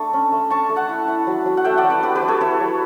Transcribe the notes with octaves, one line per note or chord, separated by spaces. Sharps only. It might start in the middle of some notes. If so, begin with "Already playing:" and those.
Already playing: A3 D4 C#6
C#4
A3
D4 A5 C#6
A3
F#5 A5
E4
E4
F#3
F#3
F#5
A3 E5 G5
D5 F#5
F#3
B4 D5
D4 G4 B4
G4 B4
F#3
A4 C#5
E4 C#5 E5
F#3